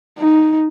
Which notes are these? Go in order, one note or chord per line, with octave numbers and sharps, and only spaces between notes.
D#4